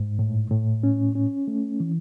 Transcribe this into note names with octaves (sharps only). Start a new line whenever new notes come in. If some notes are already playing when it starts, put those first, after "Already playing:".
Already playing: G#2
A2
A2
C#4
C#4
A3
E3